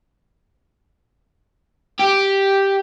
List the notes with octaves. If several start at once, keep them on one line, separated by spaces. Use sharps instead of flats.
G4